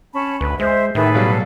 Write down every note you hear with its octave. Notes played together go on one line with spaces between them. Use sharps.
C#4 A5 B5
D2 B4
G#3 C5 E5
A2 D#3 G#4 A4 B4 E5
B2 F#3 G3 F5